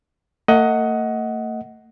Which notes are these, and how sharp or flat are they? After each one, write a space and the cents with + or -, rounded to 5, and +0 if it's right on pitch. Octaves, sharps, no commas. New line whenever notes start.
A3 +45 D#5 +20 F#5 +0